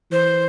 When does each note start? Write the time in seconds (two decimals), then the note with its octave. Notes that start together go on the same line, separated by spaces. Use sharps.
0.12 E3 C5